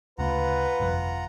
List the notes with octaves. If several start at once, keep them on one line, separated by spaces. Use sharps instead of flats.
D2 C#3 A3 F4 B4 F#5 A#5
G1 C2 F2